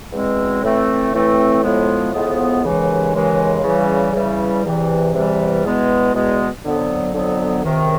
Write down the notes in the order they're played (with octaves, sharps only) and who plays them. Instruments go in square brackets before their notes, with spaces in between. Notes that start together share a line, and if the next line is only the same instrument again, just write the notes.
[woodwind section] E2 B2 G#3 C4
A2 E3 A3 C4
A2 E3 A3 C4
A2 F3 G#3 B3
A2 F3 G#3 B3
D#2 C#3 E3 G#3
D#2 C#3 E3 G#3
C#3 E3 G3
C#3 E3 G3
E2 C3 E3 G3
E2 C3 E3 G3
E2 B2 G#3 B3
E2 B2 G#3 B3
F2 D3 F#3 B3
F2 D3 F#3 B3
C#2 C3 D#3